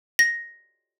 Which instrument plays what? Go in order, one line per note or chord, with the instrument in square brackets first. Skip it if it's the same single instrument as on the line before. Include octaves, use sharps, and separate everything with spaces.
[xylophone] A#6